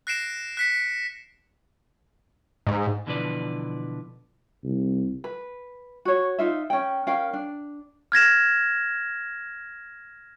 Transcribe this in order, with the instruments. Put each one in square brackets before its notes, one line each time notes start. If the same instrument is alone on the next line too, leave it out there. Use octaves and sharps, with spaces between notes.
[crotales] F#6 A#6 C7 D7 E7
F#6 B6 C#7
[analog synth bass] G#2
[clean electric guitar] B2 D3 E3 F3 B4 D5
[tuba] C2
[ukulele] B4
F#4 C#5
D#4 F4 E5
C#4 G5
C#4 A#4 F5 G5
D4
[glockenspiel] F6 G#6 A#6 E7